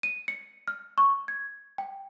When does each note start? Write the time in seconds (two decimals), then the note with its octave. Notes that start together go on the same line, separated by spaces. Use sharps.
0.03 D#7
0.28 C#7
0.67 F6
0.98 C#6
1.28 G#6
1.78 G5